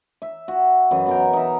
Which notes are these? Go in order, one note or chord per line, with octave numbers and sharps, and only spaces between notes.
E5
F#4
F#2 E3 D#5
B2 A#4 G5
D#4 E5